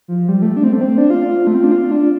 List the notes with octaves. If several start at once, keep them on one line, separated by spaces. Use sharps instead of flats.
F3
G3
A3
D4
C4
A3
C4
D4
F4
A3
C4
D4
F4
D4